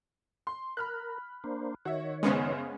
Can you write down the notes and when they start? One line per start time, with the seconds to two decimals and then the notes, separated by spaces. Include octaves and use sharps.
0.47 C6
0.77 A#4 B5 F6 F#6
1.44 A#3 D4 C5
1.85 D#3 F#4 C#5 E5
2.23 F#2 C#3 G#3 B3 C#4 C5